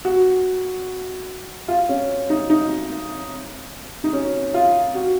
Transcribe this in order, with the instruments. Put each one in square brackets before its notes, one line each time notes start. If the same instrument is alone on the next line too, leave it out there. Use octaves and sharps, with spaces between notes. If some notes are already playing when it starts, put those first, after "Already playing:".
[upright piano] F#4
F4
C#4
D#4
D#4
D#4
C#4
F4
F#4